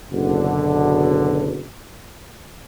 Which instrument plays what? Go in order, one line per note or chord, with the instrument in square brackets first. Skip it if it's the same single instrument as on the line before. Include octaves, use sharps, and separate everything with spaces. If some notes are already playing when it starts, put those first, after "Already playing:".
[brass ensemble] F#1 B2 D3